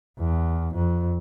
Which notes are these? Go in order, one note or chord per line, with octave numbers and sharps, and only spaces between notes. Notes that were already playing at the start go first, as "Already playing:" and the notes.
E2
F2